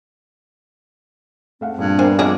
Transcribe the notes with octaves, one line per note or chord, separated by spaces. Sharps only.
A3 C4 F5 F#5
A#1 G2
B3 D4 A#4 C5 G#5
G2 D#3 F3 D4 G#4